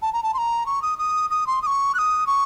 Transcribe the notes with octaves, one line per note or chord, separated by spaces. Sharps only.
A5
A#5
A5
C6
A#5
C#6
D#6
D#6
D#6
C6
D#6
C#6
F#6
D#6
C#6